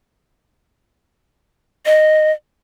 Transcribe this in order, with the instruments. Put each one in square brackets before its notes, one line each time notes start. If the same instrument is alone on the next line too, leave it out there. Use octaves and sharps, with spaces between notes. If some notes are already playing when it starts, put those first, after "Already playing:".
[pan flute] D#5